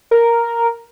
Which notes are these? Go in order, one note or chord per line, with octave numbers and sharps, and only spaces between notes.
A#4